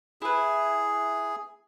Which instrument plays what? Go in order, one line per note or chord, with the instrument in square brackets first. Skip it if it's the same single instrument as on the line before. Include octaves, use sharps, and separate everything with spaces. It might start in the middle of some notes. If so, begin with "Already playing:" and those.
[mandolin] E4 B4 [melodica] G#4